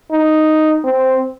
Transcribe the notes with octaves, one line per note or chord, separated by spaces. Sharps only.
D#4
C4